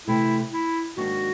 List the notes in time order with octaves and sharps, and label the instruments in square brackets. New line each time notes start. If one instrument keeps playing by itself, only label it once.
[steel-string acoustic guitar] C3 E3 A3 C4 [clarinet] E4
[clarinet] E4
[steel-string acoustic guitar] G#2 D#3 F#3 A#3 D4 [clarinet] F#4